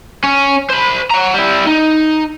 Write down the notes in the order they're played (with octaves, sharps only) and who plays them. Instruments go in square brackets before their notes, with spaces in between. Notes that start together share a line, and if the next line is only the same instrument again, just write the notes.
[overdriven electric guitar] C#4
C5 B5
F#5 A#5
G3 E4
D#4